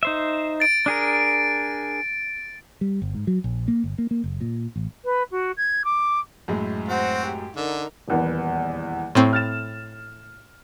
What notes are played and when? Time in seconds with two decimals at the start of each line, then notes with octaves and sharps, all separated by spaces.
0.03 D#4 C5 E5
0.60 A6 D7
0.86 D4 G#4 A#4
2.81 G3
3.02 G1
3.14 G#2
3.27 F#3
3.44 A#1
3.68 A#3
3.84 G1
3.98 A#3
4.11 A#3
4.24 F#1
4.41 A#2
4.76 A1
5.05 B4
5.31 F#4
5.57 G#6
5.85 D6
6.48 F#2 A2 G#3
6.88 C4 F#4 C5 F#5
7.26 G4
7.56 D3 D#4 A#4
8.08 D#1 E2 B3
9.15 A2 C4 C6 C#6
9.33 F6 A6 E7